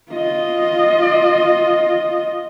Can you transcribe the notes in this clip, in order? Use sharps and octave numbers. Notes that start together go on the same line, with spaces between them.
F4 D#5